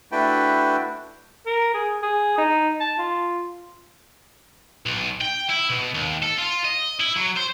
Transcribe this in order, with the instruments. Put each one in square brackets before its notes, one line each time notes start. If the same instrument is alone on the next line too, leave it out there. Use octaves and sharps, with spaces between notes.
[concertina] A3 D4 E4 F#4 B4 G5
[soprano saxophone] A#4
G#4
G#4
D#4
A5
F4
[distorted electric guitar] B1
G5
E4
B2
D#2
A4
F4
D#5
E4
F#3
C5